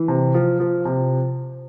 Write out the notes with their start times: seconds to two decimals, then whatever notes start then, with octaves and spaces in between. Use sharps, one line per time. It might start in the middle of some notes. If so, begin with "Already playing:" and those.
Already playing: E3
0.08 C3
0.34 F3
0.60 F3
0.85 C3